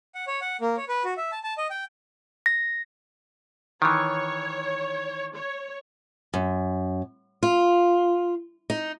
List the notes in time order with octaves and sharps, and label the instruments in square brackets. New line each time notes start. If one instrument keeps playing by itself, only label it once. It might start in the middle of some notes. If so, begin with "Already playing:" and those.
[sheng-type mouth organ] F#5
C#5
F#5
A#3
C#5
B4
F#4
E5
A5
A5
D#5
G5
[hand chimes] A#6
[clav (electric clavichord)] D#3 E3 [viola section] C#5
[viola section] C#5
[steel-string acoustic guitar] F#2
F4
D#4